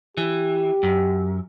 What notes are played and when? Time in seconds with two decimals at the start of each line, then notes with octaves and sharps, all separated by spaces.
0.17 E3 G4
0.83 F#2